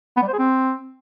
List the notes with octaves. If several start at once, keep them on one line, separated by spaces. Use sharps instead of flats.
B3
G3
C5
G#4
C4